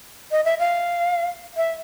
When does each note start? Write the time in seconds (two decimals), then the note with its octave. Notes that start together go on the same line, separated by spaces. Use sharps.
0.31 D#5
0.45 E5
0.59 F5
1.57 E5